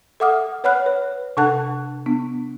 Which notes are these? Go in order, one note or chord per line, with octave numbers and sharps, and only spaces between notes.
A4 E5 F#5 D6 D#6 F6
B4 C#5 F#5 B5 F6 F#6
B4
C3 D4 A4 F#5 A5 F#6
B3 D4